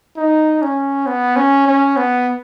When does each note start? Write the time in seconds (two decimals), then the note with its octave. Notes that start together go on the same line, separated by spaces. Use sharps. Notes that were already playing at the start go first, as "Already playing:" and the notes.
0.17 D#4
0.62 C#4
1.07 B3
1.36 C#4
1.67 C#4
1.97 B3